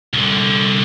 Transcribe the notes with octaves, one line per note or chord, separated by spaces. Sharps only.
C2 D3